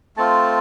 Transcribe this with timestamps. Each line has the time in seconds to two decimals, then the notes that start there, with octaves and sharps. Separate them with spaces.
0.17 A3 C4 F4 A5